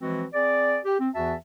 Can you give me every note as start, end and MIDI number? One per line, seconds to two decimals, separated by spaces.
0.01 0.24 52
0.01 0.24 53
0.01 0.24 56
0.01 0.24 60
0.01 0.24 66
0.33 0.78 60
0.33 0.78 68
0.33 0.78 74
0.85 0.95 67
1.00 1.09 60
1.15 1.34 40
1.15 1.34 52
1.15 1.34 66
1.15 1.34 76
1.15 1.34 81